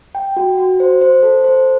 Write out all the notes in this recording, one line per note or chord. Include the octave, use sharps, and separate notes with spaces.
G5
F#4
F#4
C5
C5
A4
C5